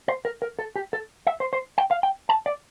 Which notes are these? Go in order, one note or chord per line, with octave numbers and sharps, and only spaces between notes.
C5
A#4
A#4
A4
G4
A4
E5
C5
C5
G5
F5
G5
A5
D5